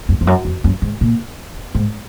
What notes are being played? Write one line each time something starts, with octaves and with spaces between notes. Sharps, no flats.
F#2
F2
F#2
F2
F#2
G#2
A#2
G#2